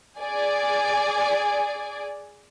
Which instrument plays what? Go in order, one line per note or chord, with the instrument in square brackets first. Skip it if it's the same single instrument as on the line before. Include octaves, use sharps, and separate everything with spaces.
[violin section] G#4 D5 G#5